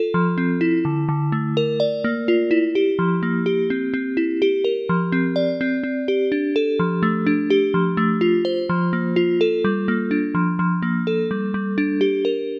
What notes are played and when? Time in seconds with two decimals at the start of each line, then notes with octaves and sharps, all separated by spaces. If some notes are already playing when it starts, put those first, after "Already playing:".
Already playing: F4 A4
0.14 F3
0.38 C4
0.61 E4
0.85 D3
1.09 D3
1.32 A3
1.57 A#4
1.80 D5
2.04 A#3
2.28 F4
2.51 E4
2.75 G4
2.99 F3
3.23 A#3
3.46 G4
3.70 C4
3.94 C4
4.17 E4
4.42 G4
4.64 A#4
4.89 F3
5.12 C4
5.36 D5
5.61 C4
5.83 C4
6.08 G4
6.32 D4
6.56 A4
6.79 F3
7.03 A3
7.26 D4
7.50 G4
7.74 F3
7.97 A3
8.21 F4
8.45 C5
8.69 F3
8.93 A#3
9.16 F4
9.41 A4
9.64 G3
9.88 A#3
10.11 D4
10.35 F3
10.59 F3
10.82 A#3
11.07 A4
11.31 G3
11.54 G3
11.78 D4
12.01 G4
12.25 A#4